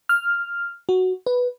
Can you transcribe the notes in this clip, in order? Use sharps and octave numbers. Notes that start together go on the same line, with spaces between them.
F6
F#4
B4